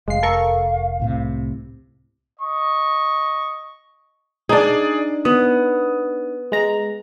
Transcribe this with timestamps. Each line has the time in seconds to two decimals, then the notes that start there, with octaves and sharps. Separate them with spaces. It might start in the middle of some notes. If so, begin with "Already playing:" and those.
0.08 F1 G#3 F5 C7
0.23 A4 A#4 C#6
1.00 C2 A2 C3
2.40 D#5 C#6
4.49 D4 D#4 G#4 D5
5.25 B3 D#6
6.52 G#3 A#5